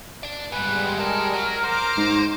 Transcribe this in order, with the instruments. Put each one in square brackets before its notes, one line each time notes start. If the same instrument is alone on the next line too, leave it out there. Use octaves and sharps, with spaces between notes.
[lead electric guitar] D4 D5
[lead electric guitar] G#2 B3 [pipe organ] G3 G#3 [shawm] B4
[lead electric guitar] D4 A4 [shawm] A#4
[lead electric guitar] F#3
[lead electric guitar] C5 [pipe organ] A#5 D6
[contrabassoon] G#2